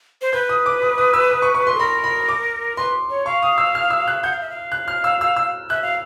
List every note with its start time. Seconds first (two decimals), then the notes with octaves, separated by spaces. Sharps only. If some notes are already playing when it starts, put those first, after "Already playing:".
0.21 C5
0.33 B4 G6
0.49 D#6
0.66 D6
0.82 D#6
0.98 D#6
1.14 E6
1.31 D#6
1.42 C#6
1.55 C#6
1.67 C6
1.75 A4
1.79 A#4 B5
2.04 B5
2.29 D6
2.76 B4 C6
3.10 C#5
3.26 F5 C#6
3.42 D#6
3.58 E6
3.75 F6
3.90 E6
4.08 F#6
4.23 F#5 G6
4.31 F5
4.41 E5
4.50 F5
4.72 F#6
4.88 F6
5.04 E6
5.21 E6
5.36 E6
5.70 E5 F#6
5.82 F5